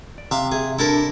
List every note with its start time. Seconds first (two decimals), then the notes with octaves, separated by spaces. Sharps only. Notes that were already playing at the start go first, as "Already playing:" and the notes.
0.18 D5
0.31 C3 E5 F5
0.52 G#4 E5
0.79 D4 E4 A4 A#4